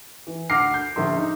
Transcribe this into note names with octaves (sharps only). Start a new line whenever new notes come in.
E3
D2 F#5 D6 F6 A#6 C7
G6
A#1 D3 E5 C6
D#4